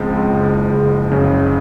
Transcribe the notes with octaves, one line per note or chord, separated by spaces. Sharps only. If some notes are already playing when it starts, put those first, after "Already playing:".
Already playing: C#2 C#3 F3 G#3 C4
F#1
F#1
F#2 C#3